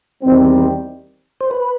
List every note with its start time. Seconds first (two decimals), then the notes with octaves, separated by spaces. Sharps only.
0.22 E2 D#3 G3 C4
1.41 C5
1.51 B4